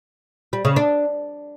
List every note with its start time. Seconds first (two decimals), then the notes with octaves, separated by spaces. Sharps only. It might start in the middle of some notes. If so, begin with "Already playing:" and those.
0.53 G3
0.65 C#3
0.76 D4